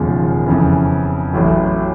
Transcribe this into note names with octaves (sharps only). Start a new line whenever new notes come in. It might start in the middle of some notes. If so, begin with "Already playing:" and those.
Already playing: E1 D#2 C#3 F3 G#3
F2 C#3 E3
A1 A2 F#3